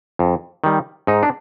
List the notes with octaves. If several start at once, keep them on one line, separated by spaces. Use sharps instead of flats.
F2
D#3 G3
G#2 D#4
D4